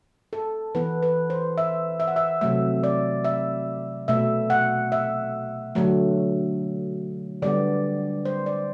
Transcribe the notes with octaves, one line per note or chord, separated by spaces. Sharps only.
A4
E3 B3 B4
B4
C5
E5
E5
F#5
E5
C3 F#3 A3 E5
D5
E5
B2 A3 E5
F#5
E5
D3 F#3 A3
D3 G3 B3 D5
C5
D5